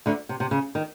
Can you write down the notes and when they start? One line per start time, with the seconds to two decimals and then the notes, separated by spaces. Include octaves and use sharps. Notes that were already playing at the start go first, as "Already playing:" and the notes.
0.06 D2 D3
0.29 C3
0.40 C3
0.51 C#3
0.75 D#3